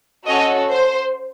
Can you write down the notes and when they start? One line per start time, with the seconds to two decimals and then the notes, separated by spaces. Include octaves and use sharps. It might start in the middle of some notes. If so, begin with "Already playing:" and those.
0.28 C#4 F#4 A4 C#5 D#5
0.71 C5